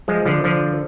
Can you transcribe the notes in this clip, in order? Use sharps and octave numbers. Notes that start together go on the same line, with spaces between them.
F3 G#3
D3 F3
D3 F3